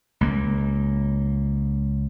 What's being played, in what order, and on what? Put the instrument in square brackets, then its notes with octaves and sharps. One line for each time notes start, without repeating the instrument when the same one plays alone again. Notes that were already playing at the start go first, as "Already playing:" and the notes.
[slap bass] C#2 A#3